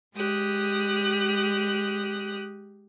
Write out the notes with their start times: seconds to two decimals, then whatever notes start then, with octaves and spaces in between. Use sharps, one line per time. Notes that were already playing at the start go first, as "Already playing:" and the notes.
0.15 G#3 G4 D#6 F#6